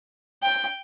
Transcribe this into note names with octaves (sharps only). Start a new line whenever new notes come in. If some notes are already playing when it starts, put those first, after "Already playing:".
G5